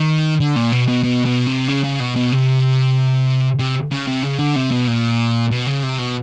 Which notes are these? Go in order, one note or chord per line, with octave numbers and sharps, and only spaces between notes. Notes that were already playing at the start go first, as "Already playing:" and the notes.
Already playing: D#3
D3
A#2
B2
B2
B2
B2
C3
C#3
C#3
B2
B2
C3
C3
C#3
C3
C#3
D3
C3
B2
A#2
B2
C#3
C3
B2